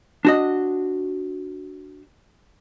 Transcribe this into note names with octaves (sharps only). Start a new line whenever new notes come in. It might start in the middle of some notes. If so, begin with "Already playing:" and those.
D4 F#4 D#5